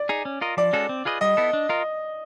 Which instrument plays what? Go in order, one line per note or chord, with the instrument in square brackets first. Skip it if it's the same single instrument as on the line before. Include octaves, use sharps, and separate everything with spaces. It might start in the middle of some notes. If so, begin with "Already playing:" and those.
Already playing: [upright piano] D5
[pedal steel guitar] D#4 G#4
C#4
F4 A#4 D#5
[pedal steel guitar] F3 [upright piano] D5
[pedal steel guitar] G#3 C#4 F#4 A4
C4
F4 G#4 B4 D#5
[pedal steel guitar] G3 [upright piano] D#5
[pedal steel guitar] B3 E4 A4
D4
F4 A#4